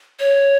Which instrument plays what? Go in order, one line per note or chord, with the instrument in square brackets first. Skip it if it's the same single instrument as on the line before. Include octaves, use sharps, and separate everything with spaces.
[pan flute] C#5